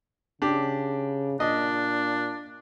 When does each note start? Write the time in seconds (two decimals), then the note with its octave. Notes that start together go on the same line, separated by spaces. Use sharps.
0.42 C#3 D4 G4
1.40 A#2 D4 D#5